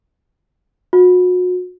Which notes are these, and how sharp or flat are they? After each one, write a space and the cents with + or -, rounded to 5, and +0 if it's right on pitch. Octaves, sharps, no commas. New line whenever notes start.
F#4 -35